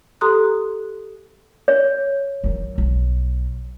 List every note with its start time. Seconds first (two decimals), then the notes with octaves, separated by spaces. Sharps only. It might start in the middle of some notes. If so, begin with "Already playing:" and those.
0.21 G4 A4 A#5 C6 D#6 F#6
1.68 C#5
2.44 D#3 F#3
2.78 B1